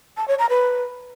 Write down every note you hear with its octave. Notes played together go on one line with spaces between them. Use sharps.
A5
C#5
A#5
B4